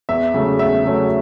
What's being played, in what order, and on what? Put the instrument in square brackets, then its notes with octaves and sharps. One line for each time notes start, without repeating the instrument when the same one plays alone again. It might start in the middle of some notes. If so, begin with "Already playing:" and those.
[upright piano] E2 E5
C#3 F#3 A3 C#4
E2 E5
C#3 F#3 A3 C#4